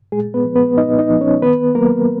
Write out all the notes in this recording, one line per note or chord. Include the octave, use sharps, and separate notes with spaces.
A#2 G#3 G#4
B3 B4
F3 B3
B3 B4
A#2 D#4 D#5
D#4 D#5
F3 B3
C#4 C#5
D#3 B3 B4
F#3 A#3 B3 A#4